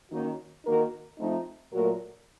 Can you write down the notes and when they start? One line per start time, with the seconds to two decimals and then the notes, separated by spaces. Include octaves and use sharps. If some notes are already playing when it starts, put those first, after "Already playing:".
0.12 D#3 A#3 C#4 D#4 F#4
0.65 D#3 A#3 D#4 F#4 A#4
1.19 F3 A3 C4 D#4
1.72 A#2 F#3 A3 F#4 A#4